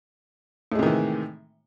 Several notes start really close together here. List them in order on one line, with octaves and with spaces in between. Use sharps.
A2 G#3 C3 D#3 E3